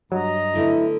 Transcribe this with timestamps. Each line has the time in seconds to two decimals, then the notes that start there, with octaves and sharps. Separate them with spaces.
0.12 G2 F#3 D#5 A#5
0.55 D3 A3 B3 E4